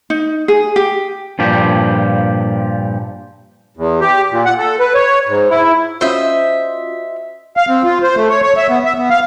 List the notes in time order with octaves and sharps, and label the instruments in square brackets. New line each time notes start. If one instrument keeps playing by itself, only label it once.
[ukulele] D#4
G#4
G4
[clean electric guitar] G2 A#2 F3 G4
[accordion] E2
G4
A#2
F#5
A4
B4
C#5
G#2
E4
[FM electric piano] C#4 F4 F#4 [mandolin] C5 D#5 E5
[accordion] F5
C4
F4
C5
A3
C#5
C#5
E5
B3
E5
B3
F5